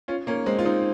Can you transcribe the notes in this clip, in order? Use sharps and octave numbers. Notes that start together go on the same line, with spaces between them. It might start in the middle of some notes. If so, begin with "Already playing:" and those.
C#4 F4
A#3 C#4
G#3 C4
F4
C4 D#4